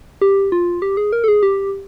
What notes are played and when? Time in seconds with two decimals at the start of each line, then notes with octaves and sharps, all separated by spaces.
0.21 G4
0.52 F4
0.82 G4
0.97 G#4
1.12 A#4
1.24 A4
1.28 G#4
1.43 G4